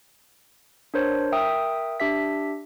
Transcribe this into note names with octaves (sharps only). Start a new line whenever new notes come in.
D4 A#4 C5 C#5
A#4 E5 G5 D#6
D4 G4 E5 B6